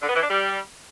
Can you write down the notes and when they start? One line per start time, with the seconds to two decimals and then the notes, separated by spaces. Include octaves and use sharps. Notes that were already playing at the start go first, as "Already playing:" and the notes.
0.02 D3
0.09 B3
0.16 E3
0.22 D4
0.29 G3